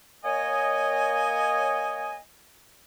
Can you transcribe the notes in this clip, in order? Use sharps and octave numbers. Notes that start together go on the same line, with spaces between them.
A#3 C#5 D#5 G#5